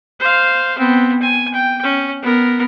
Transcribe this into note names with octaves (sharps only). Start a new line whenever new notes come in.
C5 F5
B3 C4
G#5
G5
C#4
B3 A#4